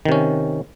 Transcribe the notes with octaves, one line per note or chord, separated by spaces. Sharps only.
C3 D#3 C#4